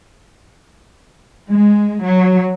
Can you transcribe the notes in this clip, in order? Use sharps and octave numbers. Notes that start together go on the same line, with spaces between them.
G#3
F#3